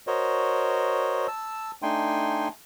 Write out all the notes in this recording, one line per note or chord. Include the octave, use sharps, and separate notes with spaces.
F#4 A#4 C5 C#5 D#5
A5 E6
A3 D4 D#4 G5 G#5 C6